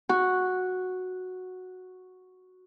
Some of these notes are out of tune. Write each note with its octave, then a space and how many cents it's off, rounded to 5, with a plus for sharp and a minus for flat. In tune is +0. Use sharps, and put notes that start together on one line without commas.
F#4 -5